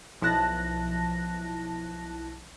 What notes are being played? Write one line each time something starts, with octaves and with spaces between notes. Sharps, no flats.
B1 F3 E4 A5 F#6 A#6